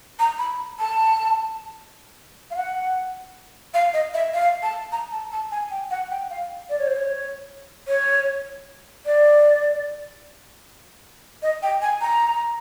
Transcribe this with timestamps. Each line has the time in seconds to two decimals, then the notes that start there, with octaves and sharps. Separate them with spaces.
0.19 A#5
0.39 B5
0.79 A5
2.51 F5
2.56 F#5
3.74 F5
3.94 D#5
4.14 E5
4.34 F5
4.63 A5
4.92 A#5
5.12 A5
5.32 A5
5.52 G#5
5.71 G5
5.91 F#5
6.10 G5
6.30 F5
6.70 D5
6.79 C#5
6.87 C5
6.96 C#5
7.87 C#5
9.06 D5
11.43 D#5
11.63 G5
11.82 G#5
12.01 A#5